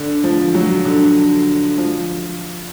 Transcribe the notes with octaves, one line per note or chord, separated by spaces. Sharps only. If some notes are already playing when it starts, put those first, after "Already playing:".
Already playing: D3
F3
F#3
D3
F3